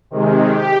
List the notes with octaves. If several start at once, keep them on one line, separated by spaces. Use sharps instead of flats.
C3 D#3 G#3
G4